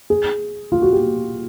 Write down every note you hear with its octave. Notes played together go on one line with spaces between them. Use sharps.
G#4
F4
F#4
G4